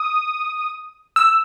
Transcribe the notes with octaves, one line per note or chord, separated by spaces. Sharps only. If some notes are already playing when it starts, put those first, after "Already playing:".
Already playing: D#6
E6